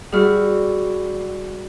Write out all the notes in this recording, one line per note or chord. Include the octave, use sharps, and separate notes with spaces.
G3 E4 F#4 G#4 F6